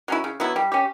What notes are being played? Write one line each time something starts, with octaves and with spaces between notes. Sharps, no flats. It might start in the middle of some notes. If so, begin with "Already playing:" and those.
F#3 C#4 E4
C#3
F#3 B3 E4
G3
C#4 G4